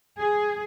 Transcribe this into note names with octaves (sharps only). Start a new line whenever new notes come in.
G#4